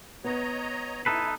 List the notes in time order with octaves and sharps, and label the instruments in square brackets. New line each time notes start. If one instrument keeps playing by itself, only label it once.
[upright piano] B3 [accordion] C#5 D#5 A#5
[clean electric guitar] D#4 A4 B4 [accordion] E4